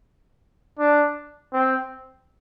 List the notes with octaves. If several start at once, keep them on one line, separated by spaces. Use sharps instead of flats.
D4
C4